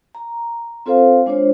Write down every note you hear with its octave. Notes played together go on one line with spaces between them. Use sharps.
A#5
C4 F4 A4 C5 F5
G#3 D4 F4 C5 C#5